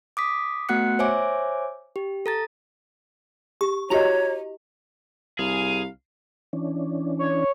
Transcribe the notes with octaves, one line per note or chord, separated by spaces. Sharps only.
D6 D#6 B6
A3 B3 F#4 F#5 F#6 C#7
C5 C#5 E5 G#5 D6
G4
A4 A#5 A6
G4 C#6
E4 F#4 G4 C#5 D#5 A#5 F7
C2 G#4 F5
E3 C#4 D4
C#5